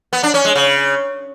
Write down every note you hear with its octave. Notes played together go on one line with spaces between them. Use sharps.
B3
D4
C#4
G#3
C#3